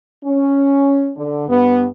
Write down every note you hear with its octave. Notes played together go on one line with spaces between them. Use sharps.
C#4
D3
G2 B3